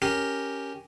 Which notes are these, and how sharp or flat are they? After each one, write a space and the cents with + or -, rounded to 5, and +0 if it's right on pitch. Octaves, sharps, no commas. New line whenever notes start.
C#4 +0 G4 +0 A#4 +0